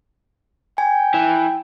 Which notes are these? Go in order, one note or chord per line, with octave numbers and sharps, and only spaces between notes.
G5 G#5
E3